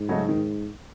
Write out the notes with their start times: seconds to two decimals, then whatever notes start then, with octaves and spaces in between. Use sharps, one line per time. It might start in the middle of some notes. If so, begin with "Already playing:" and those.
Already playing: G#2
0.09 C#3 F#3 A3 D#4
0.29 D#3